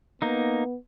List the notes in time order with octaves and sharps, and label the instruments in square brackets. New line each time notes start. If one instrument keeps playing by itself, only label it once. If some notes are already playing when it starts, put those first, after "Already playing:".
[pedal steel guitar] A#3 D#4 [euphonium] B3